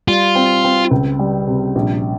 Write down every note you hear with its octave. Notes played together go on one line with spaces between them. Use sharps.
G3 F4
C4
C4
C#2
G3
C3
A#1